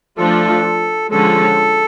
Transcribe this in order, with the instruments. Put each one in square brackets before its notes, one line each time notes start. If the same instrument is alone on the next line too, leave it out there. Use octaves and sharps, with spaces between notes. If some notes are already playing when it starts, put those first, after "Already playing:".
[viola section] F3 A3 D4 F4 [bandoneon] A4
[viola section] D3 F3 G#3 C#4 [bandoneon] A4